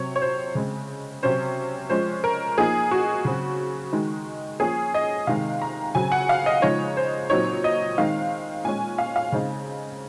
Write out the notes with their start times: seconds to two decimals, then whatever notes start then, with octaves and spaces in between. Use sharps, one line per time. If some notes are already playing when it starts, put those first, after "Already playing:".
Already playing: C3 F#3 C4 C#5
0.16 C#5
0.22 C5
0.55 C#3 G#3 C4
1.23 C3 F#3 C#4 C5
1.90 F3 G#3 C#4 C5
2.24 A#4
2.58 F3 A#3 D#4 G#4
2.91 F#4
3.25 C#3 F#3 C4
3.93 D#3 G#3 D#4
4.60 F3 A#3 C#4 G#4
4.94 D#5
5.27 C3 D#3 G#3 F5
5.62 A#5
5.95 C#3 F#3 C4 G#5
6.12 F#5
6.29 F5
6.46 D#5
6.62 C#3 F3 G#3 D#4 C#5
6.97 C5
7.30 A#2 F#3 C4 D#4 C#5
7.64 D#5
7.98 D#3 G#3 C4 D#4 F5
8.65 A#2 G#3 C#4 G#5
8.98 F5
9.16 F5
9.32 C#3 G#3 C4 D#4